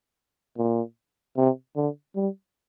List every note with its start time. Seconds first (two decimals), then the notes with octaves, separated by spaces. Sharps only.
0.58 A#2
1.37 C3
1.76 D3
2.16 G3